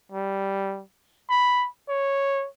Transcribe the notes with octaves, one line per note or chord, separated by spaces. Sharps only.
G3
B5
C#5